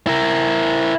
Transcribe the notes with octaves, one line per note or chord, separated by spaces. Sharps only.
E4 A#4